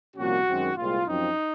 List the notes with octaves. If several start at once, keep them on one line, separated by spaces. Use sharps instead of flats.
C2 A#2 F3 A#3 C#4 F#4
F#2 D#3 G#3 C4
C2 A#2 G#3 C4 F4
F#2 F3 C4 D#4